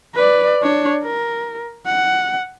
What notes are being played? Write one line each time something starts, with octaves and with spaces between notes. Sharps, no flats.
B4 D5
D4 C#5
A#4
F#5